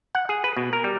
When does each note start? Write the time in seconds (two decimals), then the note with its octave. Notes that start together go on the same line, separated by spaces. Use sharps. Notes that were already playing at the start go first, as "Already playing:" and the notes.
0.15 F#5
0.29 G#4
0.44 B4
0.57 B2
0.73 A#4
0.84 G3